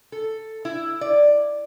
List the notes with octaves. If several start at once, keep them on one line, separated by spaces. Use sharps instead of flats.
A4
E4
D5